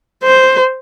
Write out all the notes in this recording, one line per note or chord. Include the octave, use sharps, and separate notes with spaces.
C5